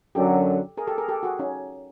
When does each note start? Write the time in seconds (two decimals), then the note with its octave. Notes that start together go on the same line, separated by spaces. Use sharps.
0.15 F#2 D3 F#3 G4 A4
0.77 G#4 A#4
0.87 G4 A4
0.98 G#4 A#4
1.08 G4 A4
1.23 F#4 G#4
1.39 C#4 D#4